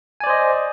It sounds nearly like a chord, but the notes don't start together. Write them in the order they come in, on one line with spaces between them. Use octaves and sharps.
G#5 D5 C5 D#5